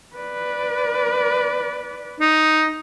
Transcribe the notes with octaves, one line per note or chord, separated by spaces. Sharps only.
B4 D5
D#4